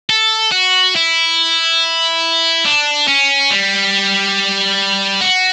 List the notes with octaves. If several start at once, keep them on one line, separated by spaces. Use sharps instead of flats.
A4
F#4
E4
D4
C#4
G3
F#4